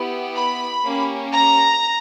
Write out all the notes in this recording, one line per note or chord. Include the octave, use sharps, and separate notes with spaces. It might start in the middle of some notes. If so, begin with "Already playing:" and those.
Already playing: B3 E4 G4
B5
A#3 C#4 G4
A#5